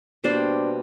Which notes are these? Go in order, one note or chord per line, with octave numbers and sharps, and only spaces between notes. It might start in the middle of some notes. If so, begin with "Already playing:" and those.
B2 G3 A#3 D4 C5 D5